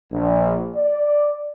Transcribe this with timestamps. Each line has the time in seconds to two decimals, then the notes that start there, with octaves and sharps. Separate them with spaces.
0.12 A#1
0.75 D5